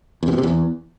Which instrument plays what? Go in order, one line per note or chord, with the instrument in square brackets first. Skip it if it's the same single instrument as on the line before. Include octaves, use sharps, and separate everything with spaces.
[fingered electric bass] E2
C3
B2
C3
E2